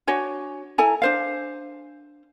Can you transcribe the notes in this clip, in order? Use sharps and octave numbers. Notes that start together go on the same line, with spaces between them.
D4 F#4 C#5 G#5
E4 A4 G#5 A#5
D4 C5 F5